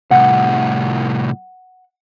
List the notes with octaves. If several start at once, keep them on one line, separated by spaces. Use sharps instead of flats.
C2 A2 F#5